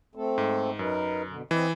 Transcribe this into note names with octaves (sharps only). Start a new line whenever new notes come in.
A3 C4 A4
G#2
F#2 D#4 A#4 B4
B2 D3
E3 C4 D#5